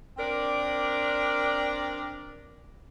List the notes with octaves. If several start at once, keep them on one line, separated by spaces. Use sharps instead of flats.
C4 D4 A#4 D5